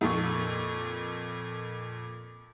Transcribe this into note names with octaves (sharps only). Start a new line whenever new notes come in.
F2 A#2 C#6